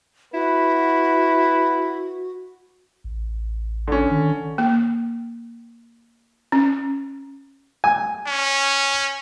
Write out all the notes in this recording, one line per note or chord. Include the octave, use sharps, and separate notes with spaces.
E4 F#4 B4
A1
D3 C#4
D#3
A#3
C#4
G#5
C#4